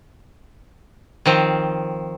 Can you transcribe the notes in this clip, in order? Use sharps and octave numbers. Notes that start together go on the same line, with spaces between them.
D#3 F3 C4